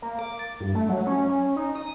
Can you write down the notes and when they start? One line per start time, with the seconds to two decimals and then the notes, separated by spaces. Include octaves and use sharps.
0.02 A#3
0.19 D6
0.39 A6
0.60 G2
0.75 A3
0.89 F#3
1.06 C#4
1.29 C#4
1.56 D#4
1.75 D#6